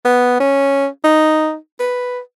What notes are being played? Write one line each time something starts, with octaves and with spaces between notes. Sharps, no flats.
B3
C#4
D#4
B4